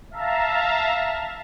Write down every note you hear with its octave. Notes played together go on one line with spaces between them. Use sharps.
E5 F5 A5 A#5